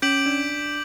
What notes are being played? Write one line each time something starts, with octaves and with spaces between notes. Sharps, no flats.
C#4 D6 G6 B6 D7 F#7
D4